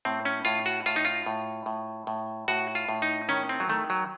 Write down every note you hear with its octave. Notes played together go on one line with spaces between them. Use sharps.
A2 C4
C#4
A2 F4
F#4
A2 F4
D#4
F4
A2
A2
A2
A2 F#4
F4
A2
D#4
D#3 C#4
C4
F#3
D#3 A3
F#3